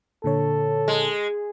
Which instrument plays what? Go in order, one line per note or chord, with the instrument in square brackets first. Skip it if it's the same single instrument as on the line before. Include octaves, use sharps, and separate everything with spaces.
[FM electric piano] A#2 D3 C#5 [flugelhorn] A4
[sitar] G#3